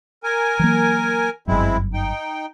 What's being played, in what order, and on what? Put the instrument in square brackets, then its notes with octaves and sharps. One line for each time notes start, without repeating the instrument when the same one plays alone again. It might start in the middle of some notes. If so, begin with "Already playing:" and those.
[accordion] A#4 G#5
[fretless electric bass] E3 F#3 A#3
[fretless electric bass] G1 F#2 [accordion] G#3 C4 E4
[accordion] D#4 G5